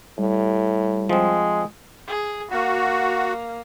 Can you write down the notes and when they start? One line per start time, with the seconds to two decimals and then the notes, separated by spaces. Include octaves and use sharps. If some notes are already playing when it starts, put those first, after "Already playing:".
0.19 A2 G3
1.09 F3 G#3 C4
2.08 G#4
2.51 A#3 F#4